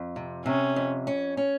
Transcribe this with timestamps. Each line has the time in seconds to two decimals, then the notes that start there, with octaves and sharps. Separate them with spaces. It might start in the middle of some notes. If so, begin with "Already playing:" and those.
Already playing: F2
0.16 C3
0.46 C3 C#4
0.76 F2
1.07 C#4
1.37 C#4